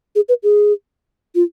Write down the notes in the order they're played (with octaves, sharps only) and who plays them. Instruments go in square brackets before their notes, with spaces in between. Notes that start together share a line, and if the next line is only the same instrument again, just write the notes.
[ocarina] G#4
B4
G#4
F4